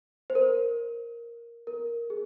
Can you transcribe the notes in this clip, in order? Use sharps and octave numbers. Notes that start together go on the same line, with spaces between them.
C5
A#4
A#4
G#4